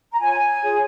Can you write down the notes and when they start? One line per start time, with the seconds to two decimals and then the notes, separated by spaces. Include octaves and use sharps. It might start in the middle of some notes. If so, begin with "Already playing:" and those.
0.12 A#5
0.19 F4 C#5 G#5
0.62 F4 G#4 C#5